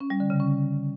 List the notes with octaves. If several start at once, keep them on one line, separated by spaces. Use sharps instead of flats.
C#4
G3
D3
C#3
C#4